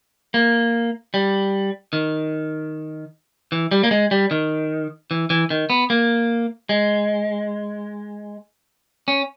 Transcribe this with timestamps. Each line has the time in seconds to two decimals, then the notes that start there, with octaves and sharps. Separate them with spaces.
0.34 A#3
1.14 G3
1.93 D#3
3.52 E3
3.71 G3
3.84 A#3
3.91 G#3
4.11 G3
4.31 D#3
5.11 E3
5.30 E3
5.50 D#3
5.70 B3
5.90 A#3
6.69 G#3
9.08 C#4